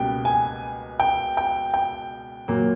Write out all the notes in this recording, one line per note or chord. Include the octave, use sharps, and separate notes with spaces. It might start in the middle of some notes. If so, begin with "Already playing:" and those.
Already playing: C#2 B2 G3 A#3 G5
G#5
G5
G5
G5
A#2 F#3 A#3